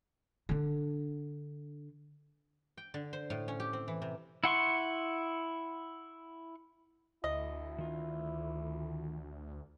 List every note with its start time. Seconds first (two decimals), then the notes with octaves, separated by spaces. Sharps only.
0.49 D3 D4
2.77 G5
2.94 D3
3.13 C5
3.30 A2
3.48 C#4
3.60 G4
3.73 C4
3.88 E3
4.02 C3
4.44 E4 F#5 C6 C#6
7.24 D2 E4 D#5
7.78 D#3 F4